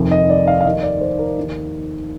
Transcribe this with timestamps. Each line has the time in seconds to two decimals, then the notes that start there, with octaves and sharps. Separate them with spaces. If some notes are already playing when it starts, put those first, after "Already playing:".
Already playing: F1 F2 D#3
0.11 D#5
0.30 D5
0.48 F5
0.61 F5
0.65 D#2 D#5
0.68 D#3
0.83 D5
1.01 C5
1.19 A#4
1.37 D#2 D#3